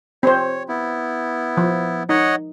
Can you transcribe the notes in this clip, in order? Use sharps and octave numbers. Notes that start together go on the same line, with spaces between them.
C4 C5 C#5
B3 E4
F3
D#4 C#5 D#5 F#5